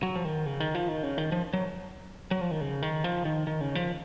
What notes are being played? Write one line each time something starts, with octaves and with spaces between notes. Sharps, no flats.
F#3
F3
D#3
C#3
D#3
F3
D#3
C#3
D#3
F3
F#3
F#3
F3
D#3
C#3
D#3
F3
D#3
D#3
C#3
F3